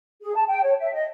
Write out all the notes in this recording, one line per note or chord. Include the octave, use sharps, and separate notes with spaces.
G#4
A5
G5
C#5
E5
D#5